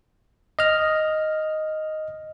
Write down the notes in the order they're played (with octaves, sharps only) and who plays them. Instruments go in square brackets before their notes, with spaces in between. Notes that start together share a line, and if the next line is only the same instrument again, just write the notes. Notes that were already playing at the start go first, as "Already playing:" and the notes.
[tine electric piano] D#5 F6